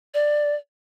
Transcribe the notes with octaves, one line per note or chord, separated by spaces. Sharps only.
D5